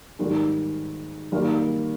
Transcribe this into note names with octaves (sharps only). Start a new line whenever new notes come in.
G#2 D#3 G3
D#3 G3 A#3